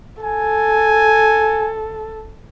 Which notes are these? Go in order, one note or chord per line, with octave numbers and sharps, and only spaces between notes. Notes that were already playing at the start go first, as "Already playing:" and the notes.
A4 G#5